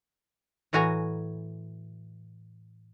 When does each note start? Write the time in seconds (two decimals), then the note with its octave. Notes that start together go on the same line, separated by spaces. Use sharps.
0.73 A2 E3 F#4 G#5 A#5